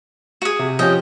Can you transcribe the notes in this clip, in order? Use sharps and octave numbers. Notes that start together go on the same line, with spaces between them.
F#4 G#4
C3
F3 C#4 G4 D#5 G5